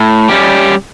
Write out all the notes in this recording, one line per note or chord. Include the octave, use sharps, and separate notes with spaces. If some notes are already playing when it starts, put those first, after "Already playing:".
Already playing: A2
G3 C#4 G4